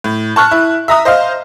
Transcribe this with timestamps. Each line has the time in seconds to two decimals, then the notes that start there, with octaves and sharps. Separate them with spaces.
0.04 A2
0.36 A5 C#6 F6 F#6
0.51 E4
0.88 E5 A#5 D#6
1.05 C5 D#5 F5 F6